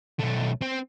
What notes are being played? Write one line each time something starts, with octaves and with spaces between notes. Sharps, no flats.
B1 A3
C4